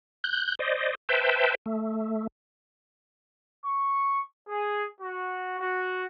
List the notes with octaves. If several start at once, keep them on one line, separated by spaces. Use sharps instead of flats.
F#6 G6
C5 D5 D#5
B4 C5 E5 G5 A5
A3
C#6
G#4
F#4
F#4